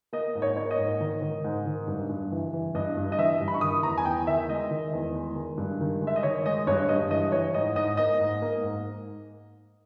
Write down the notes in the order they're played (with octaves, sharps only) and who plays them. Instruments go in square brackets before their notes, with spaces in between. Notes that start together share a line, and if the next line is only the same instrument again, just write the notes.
[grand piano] A#3 D#5
G#2
C#5
A#3 C#5
D#5
G#2
D#3
D#3
G#2
D#3
G2
G2
E3
E3
G2 D#5
G2
D#5
E3 E5
G2
B5
C#6
D#3 D#6
E2 A#5
G#5
E2 G5
D#3 E5
G#3 D#5
D#3
E2
G#3
D#3
G2
D#3
G#3
E5
D#5
D#3 C#5
G#3 D#5
G2 C#5
G2 D#5
E3 D#5
E3 C#5
G#2 D#5
G#2 D#5
A#3 D#5
G#2
A#3
G#2